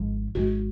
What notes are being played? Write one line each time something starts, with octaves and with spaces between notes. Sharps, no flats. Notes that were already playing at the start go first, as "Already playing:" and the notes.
Already playing: G#1 G#2 F3 G#3
G#1 G#2 F3 G#3 F#4